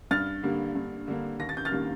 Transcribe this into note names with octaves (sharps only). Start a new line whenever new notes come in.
G2 F6 A6
D3 G3 A#3
G2
D3 G3 A#3
D#2 A#6
A6
G6
F6 A6
D#3 G3 A#3